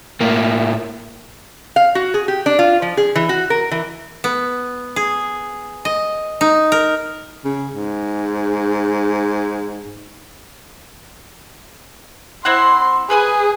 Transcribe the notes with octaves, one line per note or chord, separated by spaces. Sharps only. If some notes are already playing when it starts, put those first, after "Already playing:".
A2 A#3
F5
F#4
G#4
G4
D4
F4
F3
G#4
E3
F#4
A#4
E3
B3
G#4
D#5
D#4
A#4
C#3
G#2
C4 E4 F#5 C6
G#4 B4 G#5 D#6